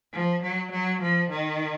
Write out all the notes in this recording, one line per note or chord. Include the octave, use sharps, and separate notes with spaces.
F3
F#3
F#3
F3
D#3